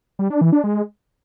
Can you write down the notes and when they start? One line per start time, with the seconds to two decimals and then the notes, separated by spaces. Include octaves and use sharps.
0.19 G3
0.30 D4
0.41 E3
0.53 D4
0.64 G#3